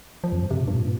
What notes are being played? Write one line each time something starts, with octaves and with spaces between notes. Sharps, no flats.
F3
F2
G2
C3
A#2
G2
A#2